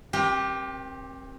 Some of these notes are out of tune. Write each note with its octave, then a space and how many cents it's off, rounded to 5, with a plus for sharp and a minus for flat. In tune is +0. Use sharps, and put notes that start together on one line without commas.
C4 +35 G4 +0 A#4 +40